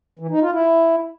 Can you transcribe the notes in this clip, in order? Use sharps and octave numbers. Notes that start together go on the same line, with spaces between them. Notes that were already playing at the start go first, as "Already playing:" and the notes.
E3
D#4
F4
E4